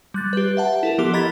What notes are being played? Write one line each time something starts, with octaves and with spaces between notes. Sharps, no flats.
G3 F#6 A6
G4 B4
E5 F#5 A5
E4 A4 A#4
F3 B3 G4 D6 F7
D#5 A#5 B5 G#6 A6 B6